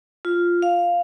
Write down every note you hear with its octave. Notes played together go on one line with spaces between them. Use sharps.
F4
F5